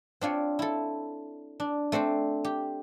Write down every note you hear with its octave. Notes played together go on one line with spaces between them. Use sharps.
C4 D4 F4 C#5
E4 A4
D4
A3 C4 D4 C5
G4